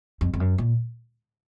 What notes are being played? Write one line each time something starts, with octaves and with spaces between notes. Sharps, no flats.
F2
F2
F#2
A#2